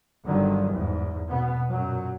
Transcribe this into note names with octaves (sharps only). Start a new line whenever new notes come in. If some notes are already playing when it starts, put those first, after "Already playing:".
G1 G2 D3 D#3 F#3
E2 G#2
B2 B3
F#2 A#2 F#3